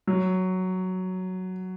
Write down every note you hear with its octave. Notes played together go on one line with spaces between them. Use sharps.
F#3